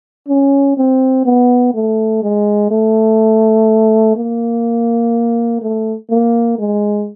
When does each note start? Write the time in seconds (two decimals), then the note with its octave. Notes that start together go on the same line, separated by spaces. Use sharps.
0.28 C#4
0.77 C4
1.26 B3
1.74 A3
2.23 G#3
2.71 A3
4.16 A#3
5.61 A3
6.10 A#3
6.58 G#3